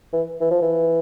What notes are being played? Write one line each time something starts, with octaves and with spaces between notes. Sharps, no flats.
E3
E3
F3
E3